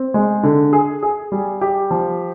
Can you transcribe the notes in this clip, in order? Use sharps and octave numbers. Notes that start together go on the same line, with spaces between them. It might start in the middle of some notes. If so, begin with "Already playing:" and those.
Already playing: C4
G#3
D3
G#4
G#4
G3
G4
F3